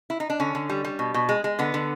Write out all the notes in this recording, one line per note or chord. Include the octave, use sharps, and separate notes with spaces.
E4
D#4
D4
D3 C#4
D3
G3
G3
B2
B2
G#3
G#3
D3 B3
D3